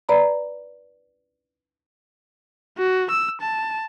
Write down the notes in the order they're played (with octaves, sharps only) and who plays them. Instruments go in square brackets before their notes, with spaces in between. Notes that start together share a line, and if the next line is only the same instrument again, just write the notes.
[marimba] B4 D5 A#5 B5
[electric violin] F#4
E6
A5